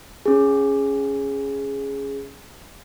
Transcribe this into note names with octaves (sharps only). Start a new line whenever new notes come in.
C#4 G#4